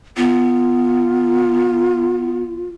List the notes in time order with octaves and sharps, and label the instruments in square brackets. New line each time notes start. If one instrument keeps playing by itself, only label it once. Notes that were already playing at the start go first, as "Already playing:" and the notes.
[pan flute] B3 [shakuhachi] F4